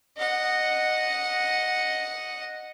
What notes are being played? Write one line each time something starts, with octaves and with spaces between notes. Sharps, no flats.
D#5 F#5